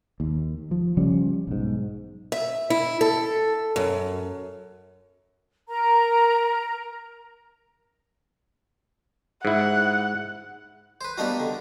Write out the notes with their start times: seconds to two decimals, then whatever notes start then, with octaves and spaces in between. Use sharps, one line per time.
0.20 D#2
0.71 F3
0.97 C#3 F3 G3 C#4
1.47 B1 G#2
2.32 E5
2.70 E4
3.01 A4
3.76 F#2
5.69 A#4 A#5
9.45 G#2 E4 F#5
11.01 B4 C5
11.17 G3 A#3 B3 D4 D#4 F#4
11.40 D3